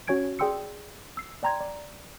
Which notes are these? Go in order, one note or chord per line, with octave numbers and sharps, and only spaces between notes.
C#4 F#4 C#5 G#5 G#6 D7
G#4 D5 G5 C6 E6 C#7
E6 C7
D5 G5 A#5 C6 G#6
D5